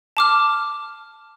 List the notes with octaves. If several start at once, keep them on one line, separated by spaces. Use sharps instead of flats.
A5 D6 F6